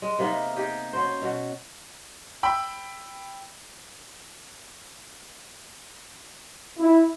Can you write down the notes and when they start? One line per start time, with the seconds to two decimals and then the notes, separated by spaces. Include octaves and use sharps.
0.02 G#3
0.19 C3 A#3 B3 D#4
0.56 D#4 G4 G#4
0.93 C#4 F#4 C5
1.22 B2 F#4
2.43 G5 B5 E6
6.79 E4